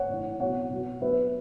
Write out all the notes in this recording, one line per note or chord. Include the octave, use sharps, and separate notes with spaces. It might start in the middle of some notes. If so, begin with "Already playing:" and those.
Already playing: C#5 F#5
A2 E3
B2 F#3 C#5 F#5
B2 F#3
B2 F#3 B4 E5